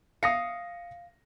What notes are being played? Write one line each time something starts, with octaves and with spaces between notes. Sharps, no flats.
F5 D#6 A#6 C#7